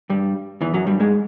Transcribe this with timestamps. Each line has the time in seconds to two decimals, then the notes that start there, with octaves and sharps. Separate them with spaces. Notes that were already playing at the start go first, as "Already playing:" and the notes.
0.10 G2 G3
0.61 E2 E3
0.74 F#2 F#3
0.87 G2 G3
1.00 G#2 G#3